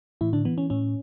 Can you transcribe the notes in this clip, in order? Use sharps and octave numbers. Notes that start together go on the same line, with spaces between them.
A2 E3 E4
D3 D4
E3 B3
C#4
A2 C#4